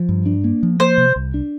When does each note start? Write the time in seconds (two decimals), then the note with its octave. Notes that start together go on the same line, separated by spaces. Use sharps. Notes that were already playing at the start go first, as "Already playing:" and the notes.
Already playing: F3
0.09 G2
0.26 D4
0.44 A#3
0.63 F3
0.80 A#3 C5
0.98 C3
1.16 C2
1.34 D4